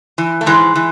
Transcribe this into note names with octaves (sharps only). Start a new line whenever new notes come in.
E3
A3
G#2 E3 G#3
E3